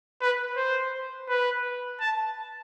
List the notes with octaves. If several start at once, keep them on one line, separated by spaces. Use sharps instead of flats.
B4
C5
B4
A5